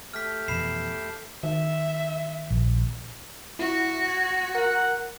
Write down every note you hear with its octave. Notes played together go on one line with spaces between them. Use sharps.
A3 G4 F6 B6
F2 B2 E3 B5 C7 E7
D#3 E5
A#1
E4 F#4
G#6
A#4 F#5